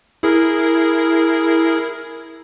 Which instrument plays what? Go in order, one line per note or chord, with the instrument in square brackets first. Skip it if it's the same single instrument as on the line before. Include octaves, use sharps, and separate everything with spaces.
[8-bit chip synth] E4 G#4 A#4